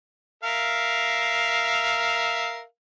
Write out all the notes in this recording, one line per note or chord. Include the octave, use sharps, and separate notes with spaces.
A#4 E5 F5